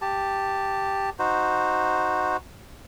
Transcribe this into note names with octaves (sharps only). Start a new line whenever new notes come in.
G4 A5
D#4 F#4 C5